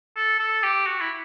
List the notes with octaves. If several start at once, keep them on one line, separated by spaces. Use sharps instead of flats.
A4
A4
G4
F#4
E4